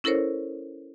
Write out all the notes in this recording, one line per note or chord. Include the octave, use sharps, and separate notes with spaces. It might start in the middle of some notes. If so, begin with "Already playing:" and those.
C#4 E4 A4 A#4 C5 C#5